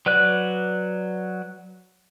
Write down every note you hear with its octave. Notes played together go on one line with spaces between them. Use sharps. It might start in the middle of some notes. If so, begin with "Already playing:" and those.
F#3 B4 D5 F#6